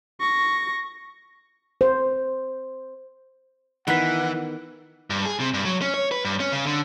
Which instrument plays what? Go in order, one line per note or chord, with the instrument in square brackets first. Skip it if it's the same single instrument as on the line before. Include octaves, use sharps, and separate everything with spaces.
[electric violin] C#6 A#6
[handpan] C5
[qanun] D#3 A#4 [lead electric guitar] E3 [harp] B3 B6 [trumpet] F#5
[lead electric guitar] G2
G#4
C3
G2
F#3
C#4
C#5
B4
G2
C#4
C#3
D3